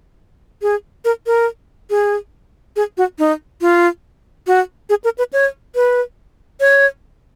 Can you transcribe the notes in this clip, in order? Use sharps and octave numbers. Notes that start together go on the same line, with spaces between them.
G#4
A#4
A#4
G#4
G#4
F#4
D#4
F4
F#4
G#4
A#4
B4
C#5
B4
C#5